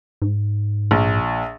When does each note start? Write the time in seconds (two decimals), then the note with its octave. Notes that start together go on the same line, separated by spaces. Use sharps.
0.22 G#2
0.91 A#1